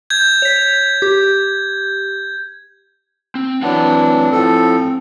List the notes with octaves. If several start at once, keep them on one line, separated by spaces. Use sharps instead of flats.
G6 G#6
C#5 B6
G4
C4
E3 F#3 C4 D4 F#5
A2 F3 A4